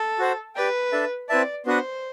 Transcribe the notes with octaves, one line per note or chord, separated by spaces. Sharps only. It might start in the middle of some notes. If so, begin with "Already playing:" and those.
Already playing: A4
F#4 C5 F#5
G4 B4 D5 G5
D4 A4 E5 A5
C4 E4 B4 D5 E5 A5
B3 D4 F#4 B4 C5 F#5